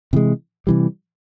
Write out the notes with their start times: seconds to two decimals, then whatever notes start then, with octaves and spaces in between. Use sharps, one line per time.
0.13 C3 E3 G#3
0.67 C3 E3 G3